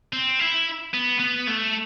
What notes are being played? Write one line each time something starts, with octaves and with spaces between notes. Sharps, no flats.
C4
E4
B3
B3
A3